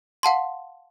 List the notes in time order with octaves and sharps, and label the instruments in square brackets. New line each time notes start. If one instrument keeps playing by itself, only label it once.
[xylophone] F5 F#5 A5 C6